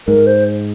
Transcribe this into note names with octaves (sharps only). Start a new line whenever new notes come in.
G#2 A#4
C5